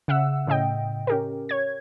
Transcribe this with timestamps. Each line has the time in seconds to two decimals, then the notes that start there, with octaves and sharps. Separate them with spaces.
0.08 C#3 E5 F#5 E6
0.47 A2 C#3 D#5 G5
1.07 C#4 G4 A#4
1.49 C#5 G#6